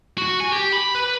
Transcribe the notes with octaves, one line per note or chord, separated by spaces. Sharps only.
F#4
G#5
G4
B5
B4